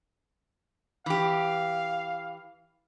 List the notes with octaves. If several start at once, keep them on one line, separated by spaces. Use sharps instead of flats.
E3 G4 F5